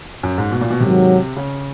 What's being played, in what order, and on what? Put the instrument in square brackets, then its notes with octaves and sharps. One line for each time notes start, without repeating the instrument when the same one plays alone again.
[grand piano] F#2
G#2
B2
A#2
B2
[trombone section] G#2 D#3 F#3 [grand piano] C3
[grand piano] C#3